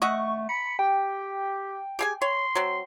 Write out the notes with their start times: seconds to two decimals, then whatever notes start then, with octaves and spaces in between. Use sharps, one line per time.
0.02 A3 D#5 E5 F#5 C#6
0.49 B5 C#7
0.79 G4 G5
1.99 G4 G#4 G#5
2.22 C#5 C6
2.55 F#3 C4